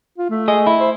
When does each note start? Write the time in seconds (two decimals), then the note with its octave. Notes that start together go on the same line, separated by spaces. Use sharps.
0.18 F4
0.30 A3
0.48 G#4 D#5
0.67 E4
0.80 C5